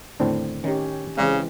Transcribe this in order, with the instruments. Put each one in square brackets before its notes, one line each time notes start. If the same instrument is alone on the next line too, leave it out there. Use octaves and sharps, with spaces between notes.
[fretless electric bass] E2 D3 D#3 [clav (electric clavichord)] A2 C4 D4
[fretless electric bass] D#3 [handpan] C#4 G4
[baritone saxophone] C#3 [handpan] E3 G#3 C4 [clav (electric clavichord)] D5 F5